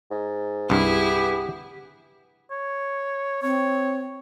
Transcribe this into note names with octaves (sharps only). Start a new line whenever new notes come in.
G#2
C2 G2 B3 E4 G4 G#4
C#5
C4 C#5